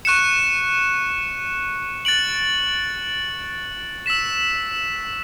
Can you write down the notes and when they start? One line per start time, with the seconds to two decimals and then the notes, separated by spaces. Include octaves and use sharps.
0.05 C#6 F#6 C#7 E7
2.05 F#6 A6 D7 F#7
4.06 E6 B6 E7